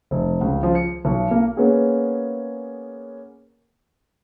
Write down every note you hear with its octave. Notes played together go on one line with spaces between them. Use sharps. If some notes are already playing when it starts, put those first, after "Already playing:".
F1
C#2
F3
C#7
B1
A#3
A#3 B3 C#4 G#4